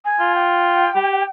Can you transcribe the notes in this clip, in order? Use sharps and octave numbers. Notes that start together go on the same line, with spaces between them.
G#5
F4
G5
G4